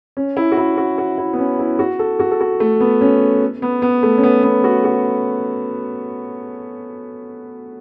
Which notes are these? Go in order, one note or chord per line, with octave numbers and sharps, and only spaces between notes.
C#4
E4
F#4
E4
F#4
F#4
E4
B3
C#4
E4
F#4
A4
F#4
A4
F#4
A3
B3
C#4
B3
B3
A3
C#4
B3
B3
F#4
F#4